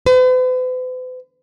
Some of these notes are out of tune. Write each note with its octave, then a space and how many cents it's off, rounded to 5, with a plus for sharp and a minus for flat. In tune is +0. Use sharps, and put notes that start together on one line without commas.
B4 +45